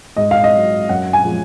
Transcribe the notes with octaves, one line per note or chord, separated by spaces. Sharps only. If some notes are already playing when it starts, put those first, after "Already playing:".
G#2 D#5
F5
D#5
F#3
F#2 F#5
G#5
F3 G#3